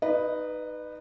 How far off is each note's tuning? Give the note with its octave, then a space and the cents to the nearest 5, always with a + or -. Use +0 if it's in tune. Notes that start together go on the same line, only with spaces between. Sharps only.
D#4 +0 B4 +0 D#5 -45